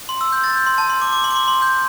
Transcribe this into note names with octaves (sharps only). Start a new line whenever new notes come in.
C6
E6
G6
A6
G6
C6
A5
C6
D6
D6
C6
D6
C6
C6
G6